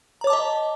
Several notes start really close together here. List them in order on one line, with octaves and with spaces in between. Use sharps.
A#5 C#5 D6 A5 D#5